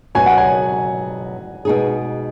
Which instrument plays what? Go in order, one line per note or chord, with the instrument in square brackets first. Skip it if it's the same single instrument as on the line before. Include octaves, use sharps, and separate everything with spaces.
[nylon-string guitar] B2 F#3 C#4 F#4 [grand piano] G#5
[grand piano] F#5
G#5
[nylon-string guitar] B2 G#3 D#4 G#4